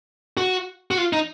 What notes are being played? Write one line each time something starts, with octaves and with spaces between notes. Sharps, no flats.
F#4
F#4
F4
D#4